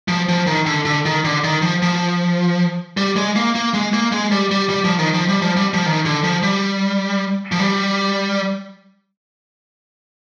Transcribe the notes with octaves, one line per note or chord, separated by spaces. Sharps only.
F3
F3
D#3
D3
D3
D#3
D3
D#3
F3
F3
G3
G#3
A#3
A#3
G#3
A#3
G#3
G3
G3
G3
F3
D#3
F3
G3
F3
G3
F3
D#3
D3
F3
G3
F3
G3